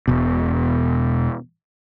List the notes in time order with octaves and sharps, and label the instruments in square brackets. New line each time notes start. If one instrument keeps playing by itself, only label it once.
[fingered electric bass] E1 B2